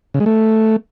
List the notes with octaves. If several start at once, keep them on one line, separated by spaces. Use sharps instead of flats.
C#3
G#3
A3